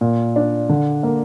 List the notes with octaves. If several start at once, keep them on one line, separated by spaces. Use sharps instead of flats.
A#2
D4
D3
A#3